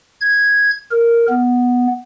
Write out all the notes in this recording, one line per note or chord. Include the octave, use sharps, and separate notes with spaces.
G#6
A#4
B3